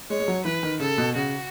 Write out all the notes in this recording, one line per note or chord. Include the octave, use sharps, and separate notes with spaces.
G#3 C#5
G#3
F#3
E3 B4
D#3
C#3 A4
B2
C#3 F#4